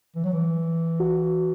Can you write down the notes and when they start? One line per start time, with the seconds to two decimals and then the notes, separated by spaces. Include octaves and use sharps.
0.16 E3
0.25 F#3
0.33 E3
1.00 F#4